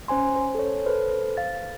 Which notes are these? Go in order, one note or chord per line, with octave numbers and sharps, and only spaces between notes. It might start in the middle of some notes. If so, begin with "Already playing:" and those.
C#4 C5 G#5 C6
C5
A4 C#5
A4 B4 C5
F5 A6